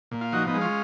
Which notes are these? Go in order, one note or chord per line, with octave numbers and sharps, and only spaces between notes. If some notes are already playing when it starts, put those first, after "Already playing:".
A#2
F4
F3 D#4 F#4
B3 D#4
G#3
C#4 F4